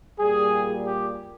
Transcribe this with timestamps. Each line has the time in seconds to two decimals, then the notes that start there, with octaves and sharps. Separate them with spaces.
0.20 A#2 G3 G#4
0.85 G4